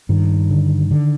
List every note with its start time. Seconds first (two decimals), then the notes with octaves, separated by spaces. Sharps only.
0.09 G2 D#3
0.50 D3
0.91 D3